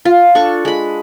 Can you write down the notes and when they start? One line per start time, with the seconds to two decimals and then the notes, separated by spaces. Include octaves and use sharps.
0.05 F4
0.35 D4 A4 C#6
0.65 G#3 B5